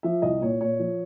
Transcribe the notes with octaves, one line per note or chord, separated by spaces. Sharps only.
F3 E5
C2 D#5
A#2 C#5
A#2 C#5
F3